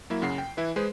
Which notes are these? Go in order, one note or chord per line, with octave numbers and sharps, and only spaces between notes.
F#3 A#3 E4
F#2 C#3 F#5 C7
G5
E3 E4 B4
G#3 G#4 B4 C5